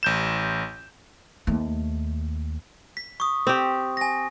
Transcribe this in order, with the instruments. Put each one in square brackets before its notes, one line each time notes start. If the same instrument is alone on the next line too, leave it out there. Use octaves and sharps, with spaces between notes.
[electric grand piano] A1 G6 E7
[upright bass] D#2 A3
[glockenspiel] B6
C#6 D#6
[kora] C4 G4
[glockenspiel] G#5 A#6